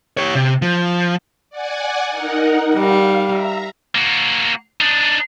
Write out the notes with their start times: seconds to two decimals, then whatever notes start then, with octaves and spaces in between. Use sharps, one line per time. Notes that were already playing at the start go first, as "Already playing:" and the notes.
0.17 G4 C#5
0.35 C3
0.62 F3
1.50 D5 F#5 G#5
2.10 D#4 A#4 F#5
2.75 G3 F5
3.25 E5 A#5
3.95 A#3 F#4
4.80 D4 D#4